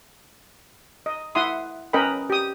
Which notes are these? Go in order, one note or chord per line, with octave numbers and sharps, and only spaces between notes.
D#5
E4 E5 F#5 C6 D#6
C#4 A#4 B4 D#5 G5 B5
G4 D#6